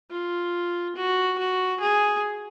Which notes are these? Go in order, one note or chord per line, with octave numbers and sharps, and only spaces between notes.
F4
F#4
F#4
G#4